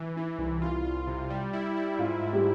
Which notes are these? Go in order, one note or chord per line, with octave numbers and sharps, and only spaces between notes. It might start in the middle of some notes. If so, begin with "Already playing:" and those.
Already playing: E3
E3 E4
C2 E4
E4 F4
F4
C3
G3
E4
E4
G#2 F4
G#2
G3 G4